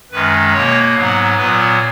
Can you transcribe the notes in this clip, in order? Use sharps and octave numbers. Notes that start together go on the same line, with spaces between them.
F#2 D#3 G#3 B4
B2 A#3 C#5
G#2 F#3 B3
A#2 F#3 B3 B4